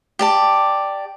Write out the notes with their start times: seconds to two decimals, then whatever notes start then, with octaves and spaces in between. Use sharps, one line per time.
0.19 G4 D5 A5